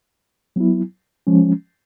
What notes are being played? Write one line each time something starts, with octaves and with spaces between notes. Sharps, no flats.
F#3 B3 E4
F3 G#3 C#4